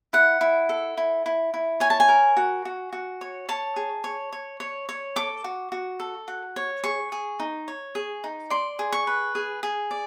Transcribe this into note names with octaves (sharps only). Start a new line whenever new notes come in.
E4 F#5
E4
A4
E4
E4
E4
C#5 G#5
A5
G#5
A#4
F#4
F#4
F#4
C#5
C#5 A5
G#4
C#5
C#5
C#5
C#5
A4 D6
F#4
F#4
A4
F#4
C#5
G#4 C#6
G#4
D#4
C#5
G#4
D#4
D5 C6
G#4
C#6
B4
G#4
G#4
D5